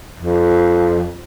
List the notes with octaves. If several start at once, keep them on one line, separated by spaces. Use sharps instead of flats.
F2